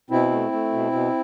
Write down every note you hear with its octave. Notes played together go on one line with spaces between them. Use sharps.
B2 C4 E4
A3
A3
B2
B2